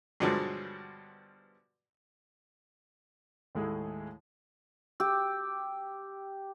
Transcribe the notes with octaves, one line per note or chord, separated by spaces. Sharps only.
G2 B2 D3 F3 F#3 G#3
D#2 A2 G#3 A3 E4 G#4
G4 E6 G6